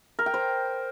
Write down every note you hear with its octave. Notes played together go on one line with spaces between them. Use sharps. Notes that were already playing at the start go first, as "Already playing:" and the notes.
A#4
G5
C5